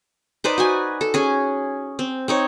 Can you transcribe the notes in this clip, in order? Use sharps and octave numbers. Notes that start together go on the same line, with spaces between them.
D#4 B4 C5 D5
F#4 B4 G#5
A4
C#4 G#4
C4
C4 D#4 C#5